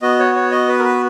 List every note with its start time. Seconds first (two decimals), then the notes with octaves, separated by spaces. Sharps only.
0.02 B3 F#4 D#5
0.19 C#5
0.35 C#5
0.52 D#5
0.68 B4
0.79 A#4
0.84 B4